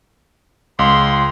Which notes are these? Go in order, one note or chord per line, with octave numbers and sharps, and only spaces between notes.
C#2 C6